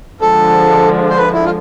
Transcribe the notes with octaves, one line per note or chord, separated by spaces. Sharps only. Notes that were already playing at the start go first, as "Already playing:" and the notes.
D3 F3 G#3 A4
C5
B4
E4
F4